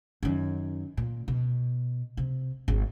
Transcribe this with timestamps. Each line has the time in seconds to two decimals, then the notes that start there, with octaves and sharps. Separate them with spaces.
0.23 F#2 D#3
0.97 A#2
1.28 B2
2.17 C3
2.68 G#1